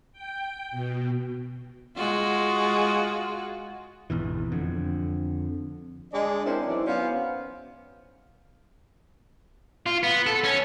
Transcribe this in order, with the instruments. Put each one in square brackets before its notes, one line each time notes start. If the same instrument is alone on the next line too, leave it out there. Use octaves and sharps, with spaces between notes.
[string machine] G5
B2
[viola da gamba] G#3 F4 F#4
[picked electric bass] G#1 E2 B2 E3
F2 D3
[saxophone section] G#3 D4 D5 D#5
C4 C#4 E4 A#4 C5 D5
E2 E3 F#3 D#4 D5
B3 C#4 C5 F5
[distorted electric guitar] F4
B3
A4
C#4